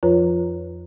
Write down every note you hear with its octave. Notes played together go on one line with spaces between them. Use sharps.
F2 F3 F4 B4 C#5 A#5